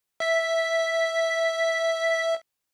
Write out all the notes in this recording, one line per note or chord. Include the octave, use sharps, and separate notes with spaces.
E5 B6